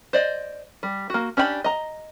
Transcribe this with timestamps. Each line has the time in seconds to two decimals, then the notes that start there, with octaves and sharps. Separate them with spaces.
0.13 C5 D5 D#5
0.83 G3
1.10 A#3 F#4
1.37 C#4 D4 G4 F#5 B5
1.64 D#5 A#5